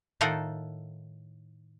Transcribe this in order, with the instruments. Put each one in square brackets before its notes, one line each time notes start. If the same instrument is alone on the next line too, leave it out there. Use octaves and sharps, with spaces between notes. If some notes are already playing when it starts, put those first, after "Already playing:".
[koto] A2 D#3 F4 A4 A#4 F#5